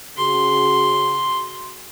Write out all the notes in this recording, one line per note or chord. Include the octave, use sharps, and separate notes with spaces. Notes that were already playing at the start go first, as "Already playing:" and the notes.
C#3 F#4 G#4 C6